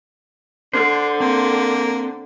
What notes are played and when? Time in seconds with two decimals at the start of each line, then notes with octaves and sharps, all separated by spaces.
0.73 D3 D4 C5
1.20 A#3 C4